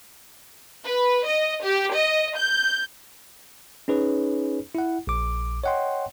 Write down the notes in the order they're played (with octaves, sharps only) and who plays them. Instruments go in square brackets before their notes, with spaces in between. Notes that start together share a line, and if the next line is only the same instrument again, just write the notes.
[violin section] B4
D#5
G4
D#5
G6
[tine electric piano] C#4 D#4 G#4 B4 C#5
E4 F#5
A#1 D6
C#5 D#5 F#5 G5 C6